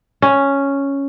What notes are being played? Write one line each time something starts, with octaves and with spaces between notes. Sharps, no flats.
C#4